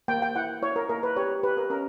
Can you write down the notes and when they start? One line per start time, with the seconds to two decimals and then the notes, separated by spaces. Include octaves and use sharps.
0.08 A#3 G5
0.22 G5
0.36 E4 F#5
0.62 E4 C#5
0.76 A#4
0.89 A#3 A#4
1.03 B4
1.16 G4 C#5
1.43 G4 B4
1.57 A#4
1.70 C#4 A#4